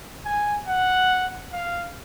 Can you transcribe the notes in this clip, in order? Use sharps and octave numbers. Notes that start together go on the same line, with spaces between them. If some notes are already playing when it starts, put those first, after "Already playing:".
G#5
F#5
F5